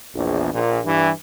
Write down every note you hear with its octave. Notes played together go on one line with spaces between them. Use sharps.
A#1 E2
A#1 A#2
G2 E3